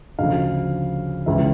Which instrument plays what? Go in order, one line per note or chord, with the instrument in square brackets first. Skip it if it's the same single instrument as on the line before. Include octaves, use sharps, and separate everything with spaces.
[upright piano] D2 C#3 F3 F5
C#2 C#3 E3 E5